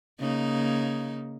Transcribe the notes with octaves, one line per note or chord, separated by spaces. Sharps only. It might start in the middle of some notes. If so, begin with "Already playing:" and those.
C#3 A#3 D#4